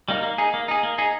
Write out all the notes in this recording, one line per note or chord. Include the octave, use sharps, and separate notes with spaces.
G3 A#3 D#4
A#3
D#4 G#4
A#3
D#4 G#4
A#3
D#4 G#4